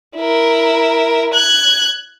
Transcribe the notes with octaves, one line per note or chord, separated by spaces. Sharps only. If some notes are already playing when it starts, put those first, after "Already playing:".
E4 A#4
F#6 G#6